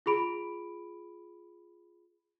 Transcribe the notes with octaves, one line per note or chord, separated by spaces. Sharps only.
F4 G#4 B5 D7